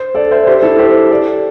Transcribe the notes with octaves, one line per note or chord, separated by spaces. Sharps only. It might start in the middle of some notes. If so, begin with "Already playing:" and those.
Already playing: C5
A4 D5
C5 E5
G4 C5
E4 A4
G4 C5
A4 D5